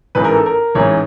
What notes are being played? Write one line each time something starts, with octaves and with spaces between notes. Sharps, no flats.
A1 G#2 E3 B4
A#4
A4
A#4
A1 G#2 E3 C#5